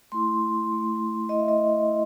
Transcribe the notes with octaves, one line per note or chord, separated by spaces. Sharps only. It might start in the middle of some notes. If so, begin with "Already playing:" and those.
A3 E4 C6
A3 E4
A3 E4 D#5
E5
D#5
E4